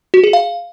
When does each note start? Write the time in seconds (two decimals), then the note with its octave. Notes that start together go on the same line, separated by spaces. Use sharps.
0.14 F#4
0.24 G#4
0.33 F5